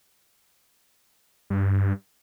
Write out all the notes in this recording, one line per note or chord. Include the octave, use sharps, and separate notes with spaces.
G2